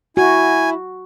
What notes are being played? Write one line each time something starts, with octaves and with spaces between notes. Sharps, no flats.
E4 F#4 G#5